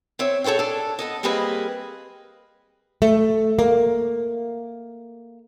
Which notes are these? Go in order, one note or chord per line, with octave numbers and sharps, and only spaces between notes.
C4 C#5 E5
G#4 A4 C5 C#5 G5
D4 A4
B3 A4 D#5
G3 A#3 C4 G#4 B4 D#5
A3
A#3